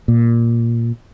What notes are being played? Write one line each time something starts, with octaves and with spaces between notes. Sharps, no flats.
A#2